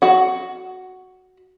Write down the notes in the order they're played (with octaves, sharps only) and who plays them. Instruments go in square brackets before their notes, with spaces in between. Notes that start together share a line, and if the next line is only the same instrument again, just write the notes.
[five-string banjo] F#4 F#5